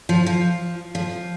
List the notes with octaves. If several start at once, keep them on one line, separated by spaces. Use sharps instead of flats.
F3
F3
F3